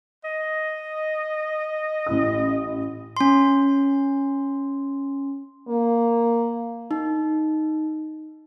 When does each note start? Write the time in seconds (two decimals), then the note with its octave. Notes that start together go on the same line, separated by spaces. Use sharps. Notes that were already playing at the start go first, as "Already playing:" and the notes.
0.24 D#5
2.07 A1 E4 D#6
3.17 C#4 C6
5.68 A#3
6.91 D#4